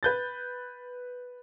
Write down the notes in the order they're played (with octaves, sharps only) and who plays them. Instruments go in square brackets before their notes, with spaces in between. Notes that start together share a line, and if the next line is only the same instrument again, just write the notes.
[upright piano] B4 G6 A6